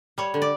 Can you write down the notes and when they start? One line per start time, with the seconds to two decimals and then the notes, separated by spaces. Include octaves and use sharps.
0.18 G3 C#5
0.34 D3
0.42 D5